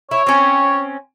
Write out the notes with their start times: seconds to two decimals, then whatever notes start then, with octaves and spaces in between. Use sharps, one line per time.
0.11 E4 C#5
0.27 C4 C#4